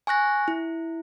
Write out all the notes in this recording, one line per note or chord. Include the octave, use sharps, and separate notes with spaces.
G#5 C#6 F#6 A#6
E4